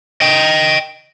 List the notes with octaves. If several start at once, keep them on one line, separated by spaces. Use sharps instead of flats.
D#5 G5